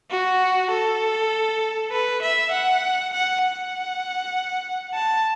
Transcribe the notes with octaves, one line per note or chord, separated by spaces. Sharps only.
F#4
A4
B4
E5
F#5
F#5
F#5
A5